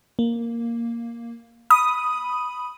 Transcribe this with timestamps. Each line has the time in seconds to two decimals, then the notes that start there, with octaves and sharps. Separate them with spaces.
0.19 A#3
1.70 B5 D#6